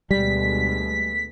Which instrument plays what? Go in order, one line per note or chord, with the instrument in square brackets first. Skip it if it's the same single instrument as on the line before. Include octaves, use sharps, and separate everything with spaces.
[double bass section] D2 B2 G#3 [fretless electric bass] G3 [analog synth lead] B6